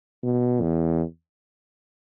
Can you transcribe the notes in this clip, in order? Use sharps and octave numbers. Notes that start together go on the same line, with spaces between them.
B2
E2